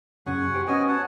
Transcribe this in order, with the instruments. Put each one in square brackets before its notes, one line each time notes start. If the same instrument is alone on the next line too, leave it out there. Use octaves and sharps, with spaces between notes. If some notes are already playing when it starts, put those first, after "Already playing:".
[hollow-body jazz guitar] F#2 C#3 [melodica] F#5 G#5 C#6
[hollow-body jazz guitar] G4 C5
[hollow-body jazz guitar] B3 C#4 [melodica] F#4 D#5 G#5
[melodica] C#5 F#5 A5